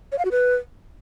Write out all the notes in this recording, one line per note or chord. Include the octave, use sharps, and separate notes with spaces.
C#5
F5
F#4
B4